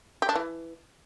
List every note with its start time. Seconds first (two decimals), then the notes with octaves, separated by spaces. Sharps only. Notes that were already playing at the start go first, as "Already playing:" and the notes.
0.22 G4
0.29 D4
0.35 E3